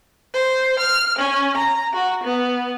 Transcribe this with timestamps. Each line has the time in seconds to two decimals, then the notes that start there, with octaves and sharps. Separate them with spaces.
0.34 C5
0.79 F6
1.19 C#4
1.57 A#5
1.93 F#4
2.23 B3